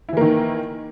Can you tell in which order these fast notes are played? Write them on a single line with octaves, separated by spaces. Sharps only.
E4 E3 A#3 D#3